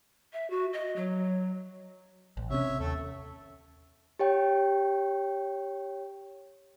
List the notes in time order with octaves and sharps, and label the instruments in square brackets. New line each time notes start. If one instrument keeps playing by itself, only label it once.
[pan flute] E5
F#4
D#5
F#3
[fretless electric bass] A1
[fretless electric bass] C3 C#4 [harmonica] C#5 E5
[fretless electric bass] D#2 [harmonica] A3 A4
[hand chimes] G4 C#5 G5